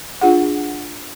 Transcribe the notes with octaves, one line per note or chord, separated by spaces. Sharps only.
D4 F4 G#4 F#5